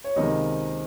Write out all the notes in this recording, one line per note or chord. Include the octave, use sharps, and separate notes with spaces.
C#5
C#2 C3 D#3 A#3 D#5